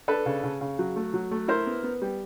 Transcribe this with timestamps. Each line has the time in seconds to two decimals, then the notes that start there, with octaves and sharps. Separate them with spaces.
0.08 D4 A4 B4
0.26 C#3
0.44 C#3
0.61 C#3
0.79 F#3
0.96 A3
1.14 F#3
1.31 A3
1.48 E4 A#4 C5
1.67 B3
1.83 B3
2.02 G3